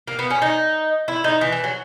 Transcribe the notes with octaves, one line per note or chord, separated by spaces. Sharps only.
A#3
B3
C#4
D#4
E4
D#4
E3
E3
F#3